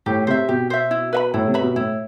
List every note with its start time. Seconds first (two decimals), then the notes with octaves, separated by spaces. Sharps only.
0.06 A2 G4
0.27 C3 C5 E5
0.49 B2 G4
0.70 C5 E5
0.91 E4
1.13 B4 E5 B5
1.34 A2 E4
1.47 C3
1.54 B4 E5 B5
1.62 B2
1.76 A2 E4